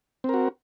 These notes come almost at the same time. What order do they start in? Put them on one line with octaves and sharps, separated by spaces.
C4 A#4 F#4